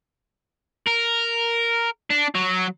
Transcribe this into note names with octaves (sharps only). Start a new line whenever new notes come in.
A#4
D4
F#3